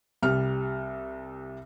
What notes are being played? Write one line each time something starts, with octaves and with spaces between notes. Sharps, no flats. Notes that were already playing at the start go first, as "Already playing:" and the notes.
C2 G3 F6